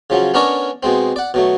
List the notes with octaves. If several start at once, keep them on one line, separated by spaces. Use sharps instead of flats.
C#3 F3 F#3
B3 C#4 D4 A#4 C#5 D5
B2 G#3 C4
D5 F#5
B2 F#3 A3